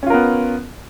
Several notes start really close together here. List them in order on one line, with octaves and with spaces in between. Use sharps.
C#4 F4 A#4 B3